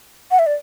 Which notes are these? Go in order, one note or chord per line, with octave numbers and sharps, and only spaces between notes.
F#5
E5
D5